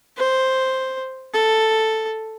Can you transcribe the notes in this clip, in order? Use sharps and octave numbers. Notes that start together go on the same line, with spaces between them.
C5
A4